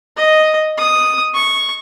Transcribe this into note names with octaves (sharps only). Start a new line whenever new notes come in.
D#5
D#6
C#6